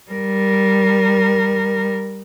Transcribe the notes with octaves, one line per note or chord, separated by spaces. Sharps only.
G3 A#4